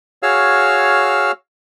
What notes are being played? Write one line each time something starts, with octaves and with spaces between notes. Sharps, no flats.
F#4 G#4 C#5 F5 E6 F6